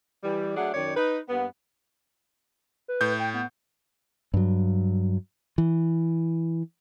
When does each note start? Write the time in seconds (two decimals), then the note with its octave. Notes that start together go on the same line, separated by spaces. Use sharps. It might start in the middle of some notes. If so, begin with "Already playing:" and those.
0.24 E3 G3
0.57 F#3 A3 D4 G#4 F#5
0.74 F#2 D#3 C#5 D5
0.97 D#4 B4
1.29 G2 A#3 B3
2.88 B4
3.01 A2 G6
3.19 G5
3.34 B3
4.34 G2 F#3
5.58 E3